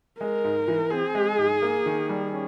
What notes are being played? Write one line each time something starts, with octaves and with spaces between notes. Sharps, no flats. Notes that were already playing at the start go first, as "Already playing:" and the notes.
G#3 A#4
G#2
E3
C4 G#4
G#3
G#2
A#3
D#3
G3
C#4